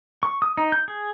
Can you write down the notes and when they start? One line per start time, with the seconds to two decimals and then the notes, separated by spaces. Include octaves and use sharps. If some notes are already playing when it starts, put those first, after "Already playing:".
0.23 C#6
0.42 D#6
0.57 D#4
0.72 G6
0.88 G#4